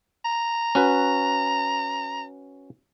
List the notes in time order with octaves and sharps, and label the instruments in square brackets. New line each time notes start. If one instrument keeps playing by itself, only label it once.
[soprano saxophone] A#5
[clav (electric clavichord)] C#4 F#4 B4